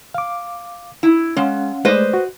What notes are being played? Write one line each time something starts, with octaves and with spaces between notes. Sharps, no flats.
F5 D6
E4
G#3 C#4 F5 F#5
G#3 A3 B4 C5 D5 D#5
F#4